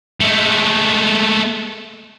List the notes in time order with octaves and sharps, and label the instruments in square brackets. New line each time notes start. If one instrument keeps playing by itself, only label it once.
[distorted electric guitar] G#3 A3